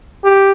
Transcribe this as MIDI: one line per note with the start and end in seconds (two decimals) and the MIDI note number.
0.24 0.52 67